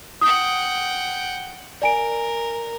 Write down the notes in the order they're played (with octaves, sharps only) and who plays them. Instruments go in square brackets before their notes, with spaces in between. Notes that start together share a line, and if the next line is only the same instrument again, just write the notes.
[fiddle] F#5 G5 [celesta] D#6
[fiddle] A#4 [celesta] D5 G#5 D7